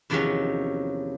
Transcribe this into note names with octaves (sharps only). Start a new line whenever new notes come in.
E2 C3 D#3 F3 F#3 C#4